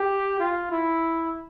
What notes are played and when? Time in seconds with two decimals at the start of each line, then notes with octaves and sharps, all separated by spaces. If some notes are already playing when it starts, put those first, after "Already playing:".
Already playing: G4
0.40 F4
0.71 E4